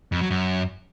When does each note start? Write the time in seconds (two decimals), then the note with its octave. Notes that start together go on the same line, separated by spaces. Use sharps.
0.12 F2
0.21 F#3
0.30 F#2